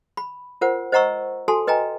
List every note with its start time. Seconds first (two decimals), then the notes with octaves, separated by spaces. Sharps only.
0.17 B5
0.61 F4 A#4 C5 F#5
0.92 C5 D#5 F#5 A#5 C#6 E6
1.48 F#4 A4 G#5 A5 C6
1.67 B4 D#5 G5 G#5 A#5